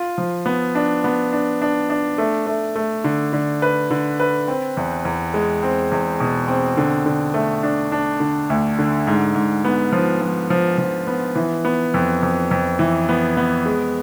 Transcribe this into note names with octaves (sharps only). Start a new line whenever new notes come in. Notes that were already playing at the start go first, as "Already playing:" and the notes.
Already playing: F4
F3
B3
D4
B3
D4
D4
D4
A3
A3
A3
D3
D3
B4
D3
B4
C4
E2
E2
G#3
C4
E2
B2
C4
D3
D3
A3
D4
D4
D3
D2
D3
G#2
G#2
B3
F3
F3
F3
F3
B3
E3
B3
F2
F2
F2
E3
B3
B3
G#3